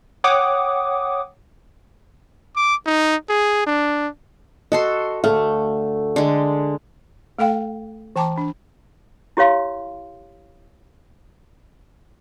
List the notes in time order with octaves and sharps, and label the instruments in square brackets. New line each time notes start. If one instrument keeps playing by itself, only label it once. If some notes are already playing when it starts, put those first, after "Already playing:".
[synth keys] C#5 F#5 G5 D6 D#6
[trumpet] D6
D#4
G#4
D4
[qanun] F#4 A4 C6 [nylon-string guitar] D#5
[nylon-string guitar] D2 A4 F5 [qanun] A3
[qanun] D3 G#3
[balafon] A3 A4 F5 G5
E3 G5 A5 A#5 D6
D4
[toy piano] E4 G4 C#5 F5 C6